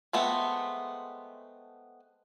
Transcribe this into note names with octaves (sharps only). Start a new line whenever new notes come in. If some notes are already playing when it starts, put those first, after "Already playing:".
G#3 A3 B3 C4